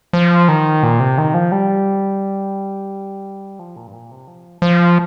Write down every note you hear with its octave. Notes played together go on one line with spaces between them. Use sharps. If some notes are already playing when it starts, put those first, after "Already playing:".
F3
D#3
A#2
C3
D#3
F3
G3
F3
A#2
G2
A#2
C3
F3
F3